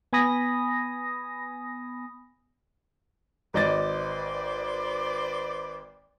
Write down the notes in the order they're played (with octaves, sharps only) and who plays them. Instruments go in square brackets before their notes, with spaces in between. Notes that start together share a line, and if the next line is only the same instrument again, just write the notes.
[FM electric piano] B3 G#5 B5 D#6 A#6
[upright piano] G#1 D#5 A6 [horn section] B4 C5 D5